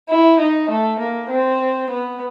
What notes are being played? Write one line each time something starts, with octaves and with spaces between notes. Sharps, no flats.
E4
D#4
A3
A#3
C4
B3